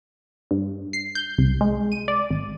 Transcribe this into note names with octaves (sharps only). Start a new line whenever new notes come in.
G2
C7
G6
C2
G#3
D#7
D5
G#1